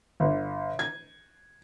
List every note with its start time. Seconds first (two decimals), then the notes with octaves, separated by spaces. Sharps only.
0.20 G1
0.79 G#6